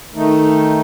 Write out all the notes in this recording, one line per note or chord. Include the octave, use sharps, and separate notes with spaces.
D#3 A3 D#4